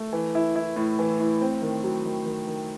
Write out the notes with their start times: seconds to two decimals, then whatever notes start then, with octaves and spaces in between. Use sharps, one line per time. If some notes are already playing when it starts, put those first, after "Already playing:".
Already playing: A3
0.13 E3
0.35 E4
0.56 E4
0.76 A2
0.99 E3
1.20 A2
1.41 C4
1.62 D#3
1.84 F#3
2.05 D#3
2.26 D#3
2.47 D#3